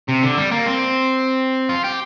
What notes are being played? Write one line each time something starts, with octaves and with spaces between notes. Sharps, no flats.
C3
D3
G3
A#3
C4
F4
G4